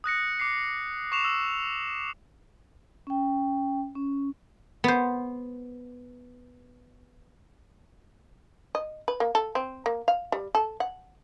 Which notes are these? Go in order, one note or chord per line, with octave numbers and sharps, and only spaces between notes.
D#6 F#6 A#6 C#7
D6 C7 C#7
C#6 D6 C7 E7 F7
E6
C#4 G5
C#4
B3 C5
D#5
B4
A#3
A4
C4
A#3
F5
G3
A4
F#5